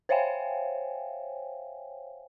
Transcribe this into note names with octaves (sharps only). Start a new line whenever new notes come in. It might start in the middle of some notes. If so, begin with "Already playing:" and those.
C5 C#5 E5 F5 G5 G#5